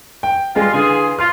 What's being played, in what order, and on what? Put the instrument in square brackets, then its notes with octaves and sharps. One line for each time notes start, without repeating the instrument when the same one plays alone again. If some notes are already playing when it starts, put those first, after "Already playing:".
[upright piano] G5
[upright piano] G3 G#3 G#4 [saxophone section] F4
[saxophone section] E2 F4 G#4 [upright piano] D3
[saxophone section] F4 [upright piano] F6